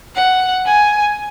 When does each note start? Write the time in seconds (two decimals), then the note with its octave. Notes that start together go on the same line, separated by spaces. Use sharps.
0.16 F#5
0.66 G#5